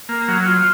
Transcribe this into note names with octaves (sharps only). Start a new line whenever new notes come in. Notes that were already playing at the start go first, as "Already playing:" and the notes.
A#3
F#3
F4